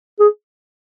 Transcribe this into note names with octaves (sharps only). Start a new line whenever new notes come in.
G#4